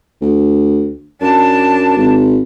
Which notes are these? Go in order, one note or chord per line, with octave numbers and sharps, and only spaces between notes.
D2
F#2 D4 A5
G#1